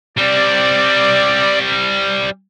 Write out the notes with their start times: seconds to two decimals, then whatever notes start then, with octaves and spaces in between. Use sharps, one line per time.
0.17 G3 C4 D5